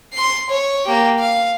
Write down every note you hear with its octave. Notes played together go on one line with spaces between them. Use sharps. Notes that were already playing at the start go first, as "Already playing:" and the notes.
C6 C7
C#5
A#3 G4
F5